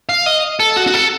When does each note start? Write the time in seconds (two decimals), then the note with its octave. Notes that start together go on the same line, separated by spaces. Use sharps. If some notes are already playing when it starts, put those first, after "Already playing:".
0.09 F5
0.26 D#5
0.60 A4
0.76 F#4
0.87 F#4
0.94 A4